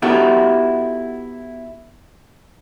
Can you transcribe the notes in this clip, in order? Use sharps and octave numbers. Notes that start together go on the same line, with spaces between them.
B3 D#4 E4 F#4 G4 A4